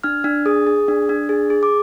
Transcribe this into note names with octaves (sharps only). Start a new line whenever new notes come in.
D4 F6
D4
G#4 D#6
G#4
D4
D4
G#4
G#4
D6